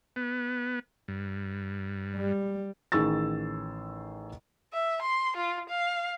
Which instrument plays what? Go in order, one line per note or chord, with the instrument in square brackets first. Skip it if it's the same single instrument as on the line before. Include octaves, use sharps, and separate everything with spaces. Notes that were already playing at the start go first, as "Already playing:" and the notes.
[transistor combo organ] B3
G2
[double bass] G3
[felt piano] A1 D#3 G#4 C#6 E6 A6
[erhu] E5
C6
F4
F5